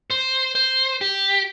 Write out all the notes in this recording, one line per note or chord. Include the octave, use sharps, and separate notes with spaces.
C5
C5
G4